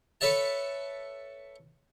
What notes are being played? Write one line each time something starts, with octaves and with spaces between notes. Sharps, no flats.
A4 B4 C#5 E5 A5